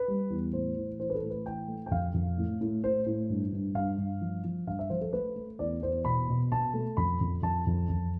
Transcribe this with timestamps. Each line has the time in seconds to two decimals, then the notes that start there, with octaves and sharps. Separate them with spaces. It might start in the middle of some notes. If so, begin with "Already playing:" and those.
Already playing: B4
0.08 G3
0.30 E2
0.53 A2 C5
0.76 E3
1.00 E3 C5
1.10 B4
1.15 A4
1.22 A2
1.30 B4
1.46 E3 G5
1.68 A3
1.86 G5
1.91 F2 F5
2.14 F2
2.38 A2
2.61 A2
2.84 A2 C5
3.06 A2
3.30 G2
3.53 G2
3.75 G2 F5
3.98 G2
4.21 F3
4.44 F3
4.67 G2 F5
4.79 E5
4.90 F3 C5
5.01 A4
5.13 A3 B4
5.36 A3
5.59 E2 D5
5.82 E2 C5
6.05 B2 B5
6.29 B2
6.52 B2 A5
6.74 A3
6.97 F2 B5
7.21 F2
7.42 F2 A5
7.67 F2
7.89 F2